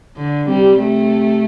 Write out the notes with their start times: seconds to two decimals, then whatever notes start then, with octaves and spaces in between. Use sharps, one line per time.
0.17 D3
0.49 C3 G3
0.79 A3